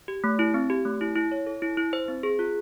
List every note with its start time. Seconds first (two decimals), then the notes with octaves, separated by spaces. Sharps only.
0.08 G4
0.24 A3
0.39 E4
0.54 C4
0.70 G4
0.85 A3
1.01 E4
1.16 E4
1.32 C#5
1.47 A4
1.62 E4
1.77 E4
1.93 C5
2.08 C4
2.23 G#4
2.39 F4